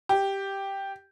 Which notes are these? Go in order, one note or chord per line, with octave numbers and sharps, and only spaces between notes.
G4